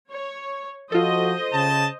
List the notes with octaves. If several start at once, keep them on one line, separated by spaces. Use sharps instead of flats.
C#5
F3 F4 F#4 A4 C5 D#5
C#3 A5